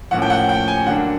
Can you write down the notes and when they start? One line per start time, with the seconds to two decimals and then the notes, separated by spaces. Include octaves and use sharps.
0.11 A2 F3 A#3 C#4 F#5
0.22 G5
0.30 F#5
0.49 G5
0.68 G#5
0.86 D3 F#3 A#3 D4 F#5